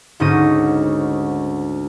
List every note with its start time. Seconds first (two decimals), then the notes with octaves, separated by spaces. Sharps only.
0.20 D2 G#2 C#4 D#4 A#6 D#7